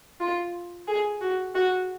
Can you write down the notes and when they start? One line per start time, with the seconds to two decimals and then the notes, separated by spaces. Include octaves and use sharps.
0.20 F4
0.87 G#4
1.21 F#4
1.55 F#4